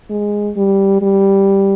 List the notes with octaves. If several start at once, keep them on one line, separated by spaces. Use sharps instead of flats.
G#3
G3
G3